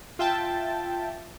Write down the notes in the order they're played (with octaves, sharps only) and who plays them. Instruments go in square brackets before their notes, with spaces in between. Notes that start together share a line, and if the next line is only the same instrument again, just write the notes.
[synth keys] F4 E5 G5 A5